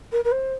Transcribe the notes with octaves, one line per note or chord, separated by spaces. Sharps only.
A#4
A#4
C5